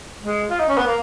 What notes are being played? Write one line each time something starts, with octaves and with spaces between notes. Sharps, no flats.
G#3
F4
D#4
C#4
B3
A#3